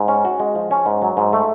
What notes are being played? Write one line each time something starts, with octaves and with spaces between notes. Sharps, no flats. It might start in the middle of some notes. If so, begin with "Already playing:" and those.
Already playing: G#2
C#4
F#4
G#3
F3
C#4
G#2
F#3
G#2
A3